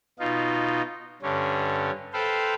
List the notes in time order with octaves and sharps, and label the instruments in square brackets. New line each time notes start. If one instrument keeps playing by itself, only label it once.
[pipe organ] B2 D#4 F4
G2 D3 C#4
A4 B4 C5 F5 G5